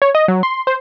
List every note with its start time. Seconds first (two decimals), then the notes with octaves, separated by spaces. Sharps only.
0.02 C#5
0.15 D#5
0.28 F#3
0.43 C6
0.67 C5